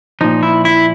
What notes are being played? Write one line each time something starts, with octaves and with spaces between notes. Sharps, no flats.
A#2 F3 D#4
E4
E4